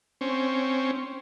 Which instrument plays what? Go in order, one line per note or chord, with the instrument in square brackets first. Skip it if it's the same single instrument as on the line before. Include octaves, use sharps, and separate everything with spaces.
[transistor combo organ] C4 C#4